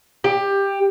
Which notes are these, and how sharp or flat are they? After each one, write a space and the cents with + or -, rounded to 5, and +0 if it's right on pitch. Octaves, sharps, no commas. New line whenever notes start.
G4 +15